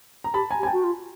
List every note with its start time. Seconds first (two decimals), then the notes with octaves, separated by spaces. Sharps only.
0.24 A#5
0.34 G4 A5 B5
0.51 G#5 A#5
0.59 G4
0.63 G#5
0.66 G5 A5
0.72 F#4
0.84 F4